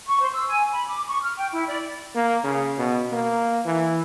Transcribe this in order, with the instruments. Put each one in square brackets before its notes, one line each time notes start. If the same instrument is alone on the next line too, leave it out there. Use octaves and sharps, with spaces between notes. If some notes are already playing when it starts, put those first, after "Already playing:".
[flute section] C#6
C5
E6
G#5
B5
D6
C#6
F6
G5
E4
D5
[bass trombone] A#3
C#3
B2
A#3
E3